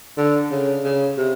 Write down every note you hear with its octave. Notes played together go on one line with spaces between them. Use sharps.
D3
C#3
C#3
C3